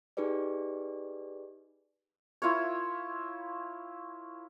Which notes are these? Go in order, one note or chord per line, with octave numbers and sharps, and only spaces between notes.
D#4 G4 G#4 B4 D5
E4 F4 A#4 C#5